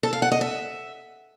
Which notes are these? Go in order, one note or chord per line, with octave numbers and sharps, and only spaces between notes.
A4
F5
F#5
D#5
E5